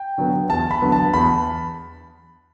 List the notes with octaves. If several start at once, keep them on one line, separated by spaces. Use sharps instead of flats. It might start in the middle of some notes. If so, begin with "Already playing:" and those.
Already playing: G5
D3 F#3 B3
E2 A5
B5
D3 F#3 B3
A5
E2 B5